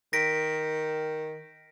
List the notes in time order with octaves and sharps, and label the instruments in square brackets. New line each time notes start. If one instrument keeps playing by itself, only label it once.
[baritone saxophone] D#3 [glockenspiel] A#6 B6 D7